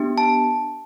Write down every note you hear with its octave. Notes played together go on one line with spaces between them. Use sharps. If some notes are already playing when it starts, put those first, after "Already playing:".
Already playing: B3 D4 G4
A5